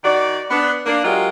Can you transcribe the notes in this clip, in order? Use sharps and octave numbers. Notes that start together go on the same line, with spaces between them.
D#3 F#4 D5
B3 D4
A#3 D4
F#3 G#3 F4 G4 A#4